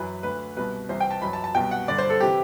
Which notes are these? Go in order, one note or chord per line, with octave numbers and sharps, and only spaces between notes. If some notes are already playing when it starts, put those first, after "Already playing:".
Already playing: F#2 E3 B4
D2 D3 B4
C2 B2 B4
C2 C3 E3 C5
G5
A5
F#2 E3 B5
A5
A5
C2 B2 G5
F#5
G2 D3 D5
C5
A4
C3 E3 G4